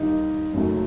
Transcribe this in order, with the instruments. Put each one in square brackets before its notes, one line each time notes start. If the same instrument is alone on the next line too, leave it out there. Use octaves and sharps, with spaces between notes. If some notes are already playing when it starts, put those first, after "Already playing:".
Already playing: [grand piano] D#2 D#3 G3 D#4
F#1 F#2 D#3 F#3 A3